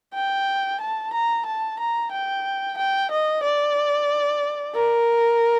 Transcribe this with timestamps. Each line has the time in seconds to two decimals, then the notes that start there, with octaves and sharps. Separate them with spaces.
0.14 G5
0.81 A5
1.13 A#5
1.45 A5
1.79 A#5
2.11 G5
2.77 G5
3.11 D#5
3.43 D5
4.75 A#4